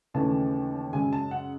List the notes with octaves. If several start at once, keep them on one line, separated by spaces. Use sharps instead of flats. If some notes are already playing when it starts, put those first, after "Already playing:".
D#2 C#3 E3 A3 A5
F#2 C#3 G#3 G#5
A5
F#5